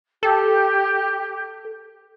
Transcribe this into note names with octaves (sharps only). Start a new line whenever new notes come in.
G4 A4